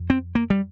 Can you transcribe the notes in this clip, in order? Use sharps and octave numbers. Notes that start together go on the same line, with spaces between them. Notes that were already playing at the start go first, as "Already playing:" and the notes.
Already playing: F2
C4
A#3
G3